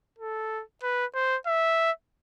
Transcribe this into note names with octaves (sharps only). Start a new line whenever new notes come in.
A4
B4
C5
E5